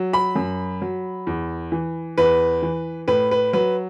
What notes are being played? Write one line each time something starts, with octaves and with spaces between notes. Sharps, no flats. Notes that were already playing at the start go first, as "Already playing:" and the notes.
Already playing: F#3
B5
F#2
F#3
E2
E3
E2 B4
E3
A2 B4
B4
F#3 B4